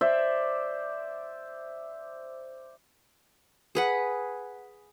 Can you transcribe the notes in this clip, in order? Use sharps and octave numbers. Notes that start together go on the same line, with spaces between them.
C5 D5 E5
G#4 B4 F#5